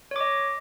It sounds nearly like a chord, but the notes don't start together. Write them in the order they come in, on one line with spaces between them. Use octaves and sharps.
C#5 D6 D#5